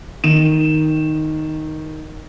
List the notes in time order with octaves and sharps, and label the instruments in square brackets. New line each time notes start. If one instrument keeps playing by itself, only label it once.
[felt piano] D#3 E7